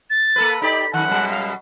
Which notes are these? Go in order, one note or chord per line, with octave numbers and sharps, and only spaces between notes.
A6
A#3 A4 B4
D#4 G4 D5 B6
F#2 D#3 F#5
F#2 B2 G3
F5